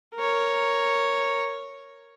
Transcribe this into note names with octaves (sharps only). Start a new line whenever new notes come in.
A#4 C#5